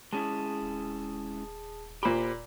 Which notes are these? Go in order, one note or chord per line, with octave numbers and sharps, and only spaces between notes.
G#3 C#4 E4 G#4 A5
D#1
A#2 G4 C5 B5